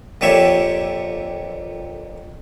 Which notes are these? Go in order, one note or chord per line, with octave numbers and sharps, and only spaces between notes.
F2 A#2 D3 G4 C#5 E5